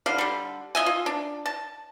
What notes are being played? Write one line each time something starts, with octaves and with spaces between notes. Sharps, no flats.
D3 G3 F5
D3 G3
F4 D#5 E5 G#5
F4
D4
A5